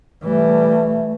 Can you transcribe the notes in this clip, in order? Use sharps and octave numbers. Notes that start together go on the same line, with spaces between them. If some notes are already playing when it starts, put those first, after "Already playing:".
E3 G3 A3